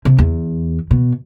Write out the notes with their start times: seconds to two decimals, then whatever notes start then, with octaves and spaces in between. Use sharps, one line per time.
0.05 C3
0.19 E2
0.91 B2